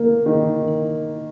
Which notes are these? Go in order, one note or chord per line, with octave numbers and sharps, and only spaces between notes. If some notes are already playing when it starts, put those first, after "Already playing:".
Already playing: A#3
D#3